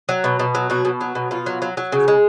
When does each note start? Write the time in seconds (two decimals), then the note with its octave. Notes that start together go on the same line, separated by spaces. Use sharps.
0.09 F#3
0.24 B2
0.39 B2
0.55 F#3
0.70 B2 F#4
0.85 B2
1.01 F#3
1.15 B2
1.31 B2 F4
1.46 F#3
1.62 F#3
1.77 F#3
1.92 C#3
2.08 G#3